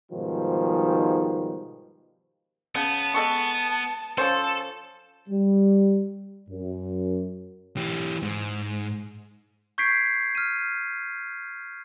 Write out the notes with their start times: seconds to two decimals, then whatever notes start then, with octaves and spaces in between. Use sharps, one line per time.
0.12 G#2 B2 D#3 F3 G3
2.75 C#3 B3 A5
3.14 G#3 A4 C#6
4.18 F3 C#4 A4 C5
5.28 G3
6.49 F#2
7.77 E3 G4
8.23 G#2
9.78 C#6 G6 G#6 B6 C7 D7
10.35 F6 D#7